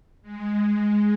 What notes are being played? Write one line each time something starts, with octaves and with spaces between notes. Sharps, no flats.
G#3